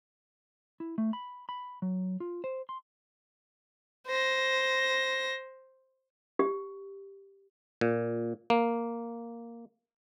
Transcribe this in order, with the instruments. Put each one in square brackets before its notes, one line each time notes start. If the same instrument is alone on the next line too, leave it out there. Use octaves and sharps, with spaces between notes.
[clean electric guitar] E4
A3
B5
B5
F#3
F4
C5
C6
[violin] C5 A#6
[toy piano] G4
[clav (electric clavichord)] A#2
A#3